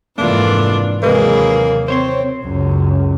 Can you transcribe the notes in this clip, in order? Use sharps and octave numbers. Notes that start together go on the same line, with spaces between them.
F1 G#2 E3 A3 A#3 D4 F4 D5
D#2 C3 E3 F#3 G#3 A#3 G#4 B4
C4 C5 C#5 C6
C#2 F#2